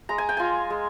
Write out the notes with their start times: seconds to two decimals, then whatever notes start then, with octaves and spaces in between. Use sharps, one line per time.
0.09 G#3 A#5
0.18 G#5
0.29 G5
0.37 F4 G#5
0.70 G#3